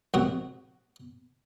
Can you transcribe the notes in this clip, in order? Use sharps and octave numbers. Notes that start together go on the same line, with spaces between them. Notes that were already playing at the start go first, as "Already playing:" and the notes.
A#1 G#2 C3 F#4